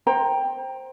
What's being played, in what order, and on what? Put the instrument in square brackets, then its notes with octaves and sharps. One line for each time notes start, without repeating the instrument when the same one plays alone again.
[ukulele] C5 G5 A#5